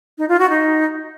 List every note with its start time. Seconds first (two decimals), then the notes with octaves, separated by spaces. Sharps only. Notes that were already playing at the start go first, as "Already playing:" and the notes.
0.18 D#4
0.29 F4
0.39 F#4
0.50 D#4